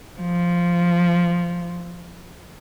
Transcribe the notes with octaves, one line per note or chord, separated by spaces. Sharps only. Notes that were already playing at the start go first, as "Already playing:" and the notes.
F3